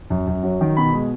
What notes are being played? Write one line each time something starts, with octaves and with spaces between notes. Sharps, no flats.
F#2
F#2
F#3
D#3
B2 B5
G#3